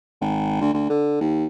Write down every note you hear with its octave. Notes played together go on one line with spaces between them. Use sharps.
G#1
D2
D2
D3
D#2